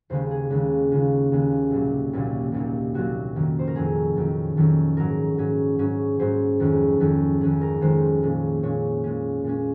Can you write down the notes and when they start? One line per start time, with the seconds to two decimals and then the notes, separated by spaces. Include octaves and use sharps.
0.10 D#2 C#3 G#3 C#4 C5
0.31 G#4
0.50 D#2 C#3 G#3 C#4
0.91 D#2 C#3 G#3 C#4 F4
1.32 D#2 C#3 G#3 C#4
1.70 C2 A#2 F#3
2.13 C2 A#2 F#3 C#4
2.52 C2 A#2 F#3 D#4
2.94 C2 A#2 F#3 F#4
3.35 F2 D#3 F#3 C#4
3.59 C5
3.67 A#4
3.75 F2 D#3 F#3 C#4 G#4
4.16 F2 D#3 F#3 C#4
4.57 F2 D#3 F#3 C#4
4.97 G#2 F#3 C#4 A#4
5.38 G#2 F#3 C#4
5.79 G#2 F#3 C#4
6.19 G#2 F#3 C#4 C5
6.60 F2 D#3 G#3 C#4
7.00 F2 D#3 G#3 C#4
7.41 F2 D#3 G#3 C#4 G#4
7.61 A#4
7.81 F2 D#3 G#3 C#4 C5
8.23 A#2 G#3 C#4
8.63 A#2 G#3 C#4 C#5
9.04 A#2 G#3 C#4
9.44 A#2 G#3 C#4